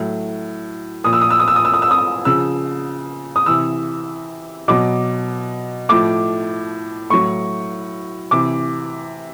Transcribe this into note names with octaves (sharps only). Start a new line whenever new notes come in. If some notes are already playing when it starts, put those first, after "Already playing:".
Already playing: A2 F#3
A#2 F3 D#6
E6
D#6
E6
D#6
E6
D#6
E6
D#6
E6
D#6
C#3 F3 E6
D#6
C3 E3 E6
B2 F#3 D6
A2 F3 D6
A2 F#3 C#6
C3 E3 D6